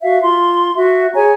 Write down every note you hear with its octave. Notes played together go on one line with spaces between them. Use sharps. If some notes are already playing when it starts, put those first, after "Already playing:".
F#4 E5 F5
F4 C6
F#4 E5
G#4 C#5 G#5 A#5